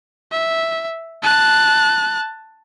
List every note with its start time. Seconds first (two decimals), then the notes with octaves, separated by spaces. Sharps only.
0.31 E5
1.23 A5 F#6